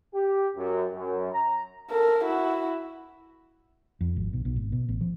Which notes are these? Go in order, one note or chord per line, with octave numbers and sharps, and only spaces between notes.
G4
F#2
F#2
A#5
A4 A#4
E4 F#4
F2
G#1
B1
B1
G#1
B2
A1
F3